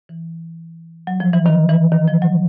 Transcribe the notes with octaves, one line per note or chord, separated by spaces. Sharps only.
E3
F#3
F3
E3
D#3
E3
D#3
F3
F#3